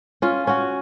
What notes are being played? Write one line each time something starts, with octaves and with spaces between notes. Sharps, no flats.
C#4 F4
C#4 F#4